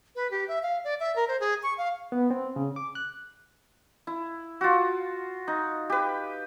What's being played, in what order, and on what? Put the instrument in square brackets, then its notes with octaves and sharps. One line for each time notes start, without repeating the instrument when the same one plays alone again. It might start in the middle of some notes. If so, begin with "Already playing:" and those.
[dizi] B4
G4
E5
F5
D5
E5
A#4
C5
G#4
C#6
F5
[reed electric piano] B3
C4
C#3
D6
F#6
[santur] E4
F4 F#4
D#4
G4 B4